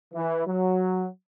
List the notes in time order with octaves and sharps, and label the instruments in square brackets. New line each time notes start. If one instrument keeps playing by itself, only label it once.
[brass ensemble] E3
F#3